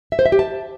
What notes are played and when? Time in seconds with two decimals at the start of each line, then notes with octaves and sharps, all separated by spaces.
0.12 E5
0.19 C5
0.26 E5
0.32 G4
0.39 A5